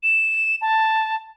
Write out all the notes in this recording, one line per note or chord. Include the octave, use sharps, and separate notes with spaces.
E7
A5